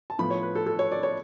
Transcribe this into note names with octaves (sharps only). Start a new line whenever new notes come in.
A5
A2 F3 B3 B5
C#5
B4
A4
A4
C#5
D5
C#5